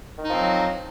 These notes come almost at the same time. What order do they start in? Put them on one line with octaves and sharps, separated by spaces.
D#3 D#4 F3 C4 F#3